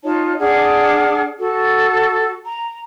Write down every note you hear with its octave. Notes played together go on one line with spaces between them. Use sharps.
D#4 F4 C#5 A5
D4 G#4 F#5 F6
F#4 A4
A#5